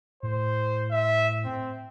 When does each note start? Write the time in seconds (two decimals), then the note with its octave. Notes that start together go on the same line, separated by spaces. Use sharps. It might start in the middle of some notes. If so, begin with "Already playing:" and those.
0.23 A2 C5
0.91 E5
1.45 C4